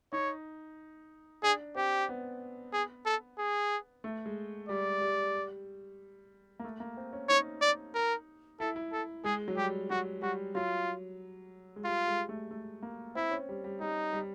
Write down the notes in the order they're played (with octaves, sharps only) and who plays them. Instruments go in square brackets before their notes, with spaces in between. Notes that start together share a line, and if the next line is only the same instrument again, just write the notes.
[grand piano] D#4 [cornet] C#5
[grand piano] D4 [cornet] G#4
[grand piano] C4 [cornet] G4
[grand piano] B3
[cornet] G#4
A4
G#4
[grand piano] A3
G#3
[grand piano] G3 [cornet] D5
[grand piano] G3
A#3
A3
A#3
C4
C#4
[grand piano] D#4 [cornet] C#5
[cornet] D5
A#4
[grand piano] E4 [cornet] A4
[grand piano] E4
[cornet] A4
[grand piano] G#3 [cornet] G#4
[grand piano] F#3
[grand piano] G3 [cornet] G4
[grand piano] F#3 [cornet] F#4
[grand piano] G3 [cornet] F#4
[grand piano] F#3 [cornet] F4
[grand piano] G#3
[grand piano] G3 [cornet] F4
[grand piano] G#3
A3
A3
A#3
[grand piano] C4 [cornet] E4
[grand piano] C#4
G3
G3
[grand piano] G3 [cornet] D#4
[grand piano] G3